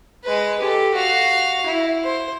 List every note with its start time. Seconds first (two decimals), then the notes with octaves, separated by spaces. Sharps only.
0.24 G#3 B4
0.60 G4 A4
0.94 F#4 F5
1.66 E4
2.04 C5